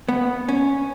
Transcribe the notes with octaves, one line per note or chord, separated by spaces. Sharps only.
B3
C#4